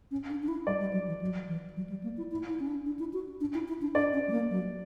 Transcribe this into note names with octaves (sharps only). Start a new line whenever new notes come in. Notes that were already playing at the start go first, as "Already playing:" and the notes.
C#4
D4
D4
E4
G3 D5
G3
F#3
E3
F#3
E3
F#3
G3
A#3
E4
E4
E4
C#4
D4
D4
E4
F#4
D4
E4
E4
D4
D4 D5
C#4
G3
A#3
F#3